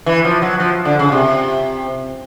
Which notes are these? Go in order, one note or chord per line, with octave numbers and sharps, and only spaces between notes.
E3
F3
F#3
F3
D3
C#3
C3